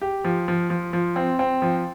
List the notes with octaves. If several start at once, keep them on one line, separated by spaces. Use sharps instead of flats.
G4
F3
F3
F3
F3
C4
C4
F3